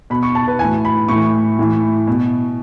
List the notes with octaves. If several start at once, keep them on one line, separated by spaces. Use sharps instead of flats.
B2 B5
C#6
A5
B4
A2 E3 G#5
B5
A2 E3 C#6
A2 E3
B2